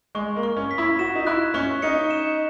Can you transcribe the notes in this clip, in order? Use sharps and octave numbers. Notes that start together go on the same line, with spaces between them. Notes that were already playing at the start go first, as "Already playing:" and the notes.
G#3 C#6
A#3
C#6
C#4
B6
E4
F#4 E7
D#4
E4 F#6
C#4 C#6
D#4 C#7
E7